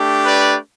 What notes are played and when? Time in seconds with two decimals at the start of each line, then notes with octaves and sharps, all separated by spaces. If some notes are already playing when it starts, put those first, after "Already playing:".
Already playing: A3 D4 G4
0.25 B4 D5